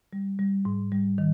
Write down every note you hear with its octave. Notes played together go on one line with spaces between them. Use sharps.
G3
G3
G#2
G3
D#3